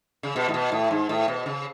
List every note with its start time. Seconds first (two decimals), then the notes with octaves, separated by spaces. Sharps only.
0.23 C#3
0.36 B2
0.48 A2
0.54 B2
0.72 A2
0.91 G#2
1.09 A2
1.28 B2
1.46 C#3